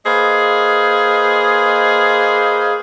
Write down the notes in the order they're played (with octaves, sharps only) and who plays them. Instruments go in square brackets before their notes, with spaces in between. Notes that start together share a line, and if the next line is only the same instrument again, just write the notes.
[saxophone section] A#3 G#4 B4 C5 D#5 F5